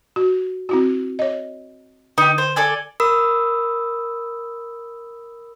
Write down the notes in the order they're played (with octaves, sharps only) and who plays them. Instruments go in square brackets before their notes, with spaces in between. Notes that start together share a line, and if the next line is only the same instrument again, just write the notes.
[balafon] F#4
C4 E4 F#4
C#5 D#5
[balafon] D3 [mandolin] D#4 G4
[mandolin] C5
A4 D5 G#5
[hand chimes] A#4 B5 D#6 E6